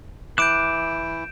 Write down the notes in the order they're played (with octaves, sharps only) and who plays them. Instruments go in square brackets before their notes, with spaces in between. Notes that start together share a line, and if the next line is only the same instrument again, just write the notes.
[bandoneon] E3 E4 [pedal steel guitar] D6 F#6 [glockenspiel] G6 D7 E7